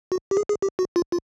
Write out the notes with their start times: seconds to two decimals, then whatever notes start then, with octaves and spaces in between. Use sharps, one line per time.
0.12 F#4
0.31 G4
0.37 G#4
0.49 G#4
0.62 G4
0.79 F#4
0.96 F4
1.12 F4